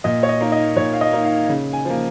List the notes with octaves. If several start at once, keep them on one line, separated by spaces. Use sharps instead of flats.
A#2 D#5
C#5
D#5
A#3 D#4
D#5
A#2 C#5
F5
D#5
A#3 D#4
F5
C#3
G#5
F3 A#3